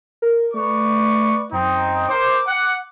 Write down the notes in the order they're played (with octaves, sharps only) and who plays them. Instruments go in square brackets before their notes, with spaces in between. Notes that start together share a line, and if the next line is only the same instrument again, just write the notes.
[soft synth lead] A#4
[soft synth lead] A3 [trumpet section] B4 D5 C#6
[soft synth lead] F#2 [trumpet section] C4 D#4
[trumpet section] A#4 C5 [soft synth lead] D6
[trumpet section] F#5